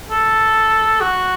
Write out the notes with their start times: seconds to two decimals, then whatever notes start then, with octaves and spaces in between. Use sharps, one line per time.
0.10 A4
1.01 F#4